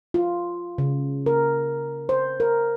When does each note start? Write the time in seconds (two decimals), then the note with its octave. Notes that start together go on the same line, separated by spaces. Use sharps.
0.14 F4
0.78 C#3
1.26 A#4
2.09 C5
2.40 A#4